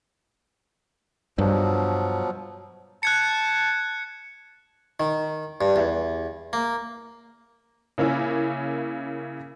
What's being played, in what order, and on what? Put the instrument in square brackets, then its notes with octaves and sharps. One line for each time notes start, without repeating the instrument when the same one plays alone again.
[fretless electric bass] G2 [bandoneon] B2 F3 F#3
[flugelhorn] A5 [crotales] F#6 G#6 C#7
[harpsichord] D#3
G2
E2
A#3
[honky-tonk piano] C#3 A#3 C#4 E4